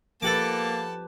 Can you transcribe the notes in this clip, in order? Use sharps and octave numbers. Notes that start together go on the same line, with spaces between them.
F3 A#3 G4 A4 B4 F#5 A5 D6